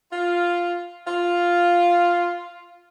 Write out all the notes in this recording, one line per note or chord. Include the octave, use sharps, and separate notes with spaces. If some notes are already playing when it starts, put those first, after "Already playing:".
F4
F4